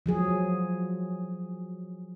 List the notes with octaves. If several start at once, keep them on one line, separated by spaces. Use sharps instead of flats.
F3 F#3 G#4